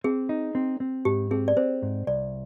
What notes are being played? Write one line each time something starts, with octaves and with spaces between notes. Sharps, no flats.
C4 G#4
D#4
C4
C4
G#2 G4
C4 G#4
D5
C4 C5
G#2
C2 D5